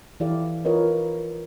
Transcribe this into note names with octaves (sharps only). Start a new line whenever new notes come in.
E3 E4 G4 A4 D5 F5
F4 A#4 B4 C#5 D#5